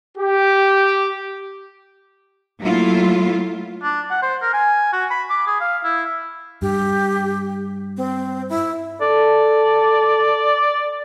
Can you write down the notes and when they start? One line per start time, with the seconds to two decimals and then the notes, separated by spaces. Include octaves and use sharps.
0.17 G4
2.61 F#3 A3 A#3 E4 F4
3.83 D4
4.10 F#5
4.23 C5
4.42 A#4
4.54 G#5
4.93 F#4
5.11 B5
5.30 D6
5.47 G#4
5.60 F5
5.84 E4
6.62 G2 G4
7.97 C4
8.49 E4
9.01 A4 D5